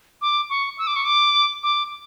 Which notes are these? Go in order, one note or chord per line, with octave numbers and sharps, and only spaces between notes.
D6
C#6
E6
D6
C#6
D6
D6